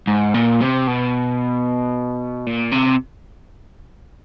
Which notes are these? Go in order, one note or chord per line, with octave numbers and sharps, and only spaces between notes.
G#2
A#2
C3
B2
A#2
C3